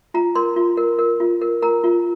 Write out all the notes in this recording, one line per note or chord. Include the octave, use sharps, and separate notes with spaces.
F4 A#5
A#4 C6
F4
A#4
A#4
F4
A#4
A#4 A#5
F4